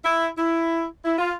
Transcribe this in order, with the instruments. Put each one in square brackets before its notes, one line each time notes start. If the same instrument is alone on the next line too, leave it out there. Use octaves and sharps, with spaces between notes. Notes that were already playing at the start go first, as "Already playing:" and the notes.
[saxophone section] E4
E4
E4
F4